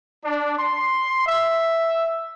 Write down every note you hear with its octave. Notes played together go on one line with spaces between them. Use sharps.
D4
C6
E5